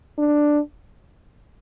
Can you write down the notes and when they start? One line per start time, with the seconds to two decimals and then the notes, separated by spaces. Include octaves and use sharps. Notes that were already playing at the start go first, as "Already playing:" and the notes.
0.18 D4